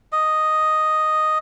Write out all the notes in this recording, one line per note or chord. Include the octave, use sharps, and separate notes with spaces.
D#5